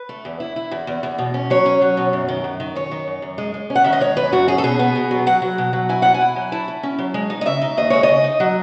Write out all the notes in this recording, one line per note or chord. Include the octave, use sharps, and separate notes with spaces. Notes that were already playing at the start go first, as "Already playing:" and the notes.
Already playing: B4
A3
E2
E4
E4
E2
E2
E2
B2
C#4
F#3 C#5
C#4
F#3
B2
F#2
D#3
F#2
D#3
F#2 C#5
D#3
F#2
F#2
G#3
G#3
C#4
F#5
D#3 E5
D#5
G#3 C#5
F#2 B4
F#2 F#4
C#4 G#4
A4
B2 G#4
B3
B2
F#3
F#3 F#5
F#3
B2
F#3
E4 G#5
B2 F#5
G#5
E4
F#3
E4 A5
E4
C#4
F#3
G#3
D#4
D#5
C#3 E5
D#4
D#2 D#5
G#3 C#5
D#5
C#3
D#4
F#3